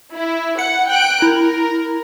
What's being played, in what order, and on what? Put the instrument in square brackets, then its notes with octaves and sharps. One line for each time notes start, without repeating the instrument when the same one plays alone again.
[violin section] E4
[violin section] F#5 [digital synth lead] C#7
[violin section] G5 F#6 D7
[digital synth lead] E4 [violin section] A#4